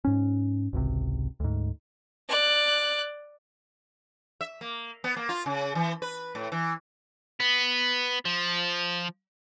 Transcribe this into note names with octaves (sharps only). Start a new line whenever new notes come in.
G#2 C#4
G#1 C#2 C3
D2 G#2
D5 F#6
E5
A#3
B3
A#3
F4
C#3
E3
B4
A2
E3
B3
F3